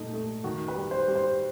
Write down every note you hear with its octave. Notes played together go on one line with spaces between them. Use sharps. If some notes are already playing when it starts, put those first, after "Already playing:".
Already playing: A#2 A3 D#4
A3
D#3 F#4
B4
G3
C5
G3
C5